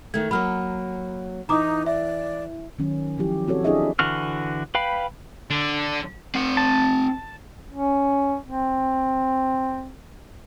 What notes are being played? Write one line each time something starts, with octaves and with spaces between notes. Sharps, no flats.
D#3 A3 G#6
F#3 A#3 C#5 B5 F6
E3 D#4 A#5 D6 D#6
D5 E5
D#3 F#3 C#4
F3 F#3 E4 G4
C4 F#4 A4 C#5
D4 E4 G#4 A4 D#5 E5
D3 E3 F#4 F6
B4 F5 G5 B5
D3 D4
C4 F#5
A5
C#4
C4